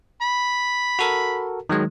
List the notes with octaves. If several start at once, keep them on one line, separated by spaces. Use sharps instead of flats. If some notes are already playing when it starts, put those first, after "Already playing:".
B5
F#4 A4 A#4
D#3 F#3 G#3